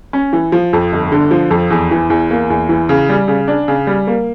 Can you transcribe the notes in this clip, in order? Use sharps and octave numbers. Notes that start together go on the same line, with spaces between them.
C#4
E3
F3
F2
G1
D3
F3
F2
E2
E3
E2
A#3
E2
E3
C#3
G3
C#3
D4
C#3
G3
A#3